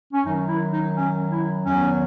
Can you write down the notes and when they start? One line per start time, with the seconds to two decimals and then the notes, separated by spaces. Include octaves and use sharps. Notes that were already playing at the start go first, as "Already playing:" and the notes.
0.12 C#4
0.24 F#2 D#3 F#3 D#4
0.48 E4
0.72 D#4
0.95 C#4
1.31 E4
1.66 E2 D#3 F#3 C#4